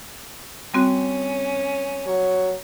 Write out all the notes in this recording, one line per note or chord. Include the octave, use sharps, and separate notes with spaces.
G3 C4 C#4 F#4
F#3 C#5